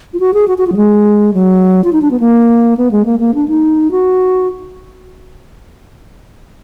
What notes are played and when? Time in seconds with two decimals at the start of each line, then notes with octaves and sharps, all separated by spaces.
0.13 F4
0.20 F#4
0.34 G#4
0.48 F#4
0.58 F#4
0.67 F4
0.72 F#3
0.77 G#3
1.34 F#3
1.84 F4
1.93 D#4
2.02 D4
2.11 B3
2.20 A#3
2.77 B3
2.91 G#3
3.05 A#3
3.20 A#3
3.35 D4
3.48 D#4
3.91 F#4